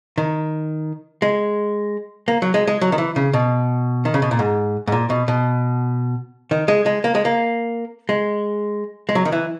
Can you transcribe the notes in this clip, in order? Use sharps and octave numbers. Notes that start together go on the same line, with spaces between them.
D#3
G#3
A#3
F#3
G#3
G#3
F#3
D#3
E3
C#3
B2
D#3
C#3
B2
A#2
G#2
G#2
A#2
B2
B2
D#3
G#3
G#3
A#3
G#3
A#3
G#3
G#3
F#3
D#3
E3